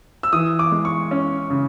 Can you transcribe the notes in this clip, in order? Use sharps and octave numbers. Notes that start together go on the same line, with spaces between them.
E6
E3 D#6
D6
G#3
C#6
C#4
C#3